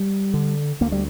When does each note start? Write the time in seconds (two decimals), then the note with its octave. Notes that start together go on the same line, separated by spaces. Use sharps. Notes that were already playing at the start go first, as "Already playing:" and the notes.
Already playing: G3
0.34 D3
0.81 D2 A#3
0.92 G3